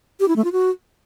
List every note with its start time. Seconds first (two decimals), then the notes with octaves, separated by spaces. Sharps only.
0.20 G4
0.28 E4
0.36 A3
0.44 F4
0.52 F#4